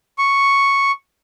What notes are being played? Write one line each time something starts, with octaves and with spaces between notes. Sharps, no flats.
C#6